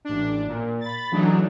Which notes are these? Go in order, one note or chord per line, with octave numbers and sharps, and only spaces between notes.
A1 D4
A#2
B5 A6
C#3 E3 F#3 A3 D4 D#4